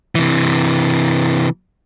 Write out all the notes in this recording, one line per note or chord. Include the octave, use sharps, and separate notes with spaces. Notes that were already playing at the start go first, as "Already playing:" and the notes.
C3 E3